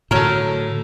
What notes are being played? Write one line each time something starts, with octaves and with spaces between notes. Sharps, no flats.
A2 D3 F#3 A3 A#4